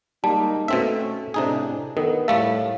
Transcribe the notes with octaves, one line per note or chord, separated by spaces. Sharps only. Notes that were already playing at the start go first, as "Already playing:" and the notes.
G3 G#3 A#3 D#4 A5
B2 A3 C4 C#4 E5
A2 C3 D4 D#4 G#4
D#3 B3 A4 A#4
A2 G3 A3 A4 F5